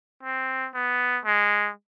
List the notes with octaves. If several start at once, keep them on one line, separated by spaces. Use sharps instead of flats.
C4
B3
G#3